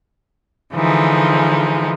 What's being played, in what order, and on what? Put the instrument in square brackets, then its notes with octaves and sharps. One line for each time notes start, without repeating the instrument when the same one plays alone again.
[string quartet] D3 E3 F3 G#3 D#4